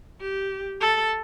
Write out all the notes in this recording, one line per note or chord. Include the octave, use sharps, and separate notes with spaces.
G4
A4